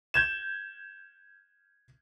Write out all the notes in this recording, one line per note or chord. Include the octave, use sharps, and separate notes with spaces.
G6 G#6 E7